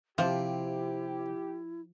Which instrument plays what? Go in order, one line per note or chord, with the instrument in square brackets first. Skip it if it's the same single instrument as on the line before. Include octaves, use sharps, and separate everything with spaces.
[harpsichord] C3 [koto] F3 [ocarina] E4 [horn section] G4